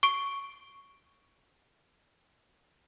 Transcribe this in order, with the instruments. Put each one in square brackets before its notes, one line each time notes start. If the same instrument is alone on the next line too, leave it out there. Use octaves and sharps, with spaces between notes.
[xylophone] C#6 C7 D7